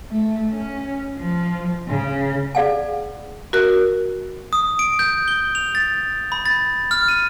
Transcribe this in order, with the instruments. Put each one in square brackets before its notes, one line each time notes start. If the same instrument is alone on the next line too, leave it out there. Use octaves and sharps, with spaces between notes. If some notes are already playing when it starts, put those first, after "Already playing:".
[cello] A3
C#4
F3
C#3
[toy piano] G#4 D5 F5 F#5 G#5
[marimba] F#4 A#4 F#6
[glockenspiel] D#6
D7
G6
G7
F7
A6
B5
A6
F6
D#7